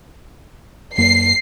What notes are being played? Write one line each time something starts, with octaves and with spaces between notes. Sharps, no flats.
F#2 A#3 C7